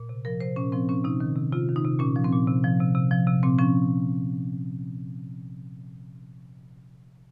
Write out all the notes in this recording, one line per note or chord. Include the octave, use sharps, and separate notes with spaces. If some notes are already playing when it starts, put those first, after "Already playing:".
Already playing: A#2
C3
F3 A#4
C3 C5
A#2 C#4
F3 C4
A#2 C#4
C3 D#4
D#3
C3
C3 F4
D#3
D#4
C3
A#2 C#4
F3
C4
A#2
C3
F3
C3
C3
F3
C3
A#2 C4
F3 C#4